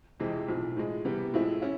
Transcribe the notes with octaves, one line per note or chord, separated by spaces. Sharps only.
F2 C3 E3 G#3 C4
B1 A2 F3
A2 F3 G#3
C3 E3 G3 B3
A2 F3 G#3 C4 E4
C#4 E4